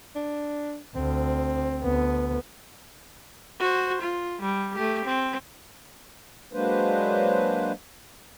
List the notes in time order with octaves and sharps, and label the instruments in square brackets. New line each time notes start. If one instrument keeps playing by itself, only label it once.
[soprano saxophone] D4
[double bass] D2 [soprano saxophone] C4
[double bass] D2 B3
[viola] F#4 C5
F4
G3
A3 G4
C4
[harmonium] F#3 G#3 A#3 D4 B4 C5